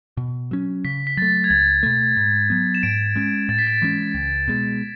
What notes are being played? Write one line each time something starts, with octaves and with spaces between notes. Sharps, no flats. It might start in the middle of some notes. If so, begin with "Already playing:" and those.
B2
F#3 C#4
C#3 B6
B6
F#3 A3 A6
G#6
C#2 A6
B2 A3
G#2
F#3 B3
E7
G#2 D7
G#3 C#4
A2 A6
B6
A6
E3 G#3 C#4
C#2
B2 G#3